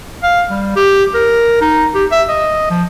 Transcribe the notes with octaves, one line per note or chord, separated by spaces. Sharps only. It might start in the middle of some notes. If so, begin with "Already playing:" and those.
F5
G3
G4
A#4
D#4
G4
E5
D#5
F3